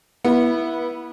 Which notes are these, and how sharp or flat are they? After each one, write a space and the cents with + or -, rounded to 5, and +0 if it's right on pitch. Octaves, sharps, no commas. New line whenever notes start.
B3 -20 E4 +0